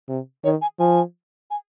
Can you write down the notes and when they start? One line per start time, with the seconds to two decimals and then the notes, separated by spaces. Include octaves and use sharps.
0.09 C3
0.44 D#3 C#5
0.62 G#5
0.80 F3 G#5
1.50 G#5